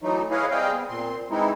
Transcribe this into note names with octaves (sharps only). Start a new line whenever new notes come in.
E3 F#3 A3 D#4
E4 G#4 B4 C#5 D#5 F5
G3 C4 G#4 D#5 F5 G5
B3
A#2 C4 C6
E3 G#3 C4 D#4 E4